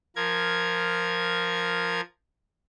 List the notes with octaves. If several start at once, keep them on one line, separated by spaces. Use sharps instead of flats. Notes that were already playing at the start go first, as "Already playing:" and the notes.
F3 A#4 G#6